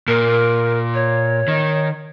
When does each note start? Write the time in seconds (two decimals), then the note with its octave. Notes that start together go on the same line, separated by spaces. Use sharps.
0.08 A#2 A#4
0.94 C#5
1.48 D#3